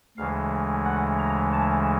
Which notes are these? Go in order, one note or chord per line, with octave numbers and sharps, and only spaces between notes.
D2 C#3 E3 G#3 F5
F#5
A#5
A5